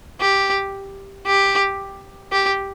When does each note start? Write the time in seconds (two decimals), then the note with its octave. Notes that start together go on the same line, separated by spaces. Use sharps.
0.20 G4
1.26 G4
2.32 G4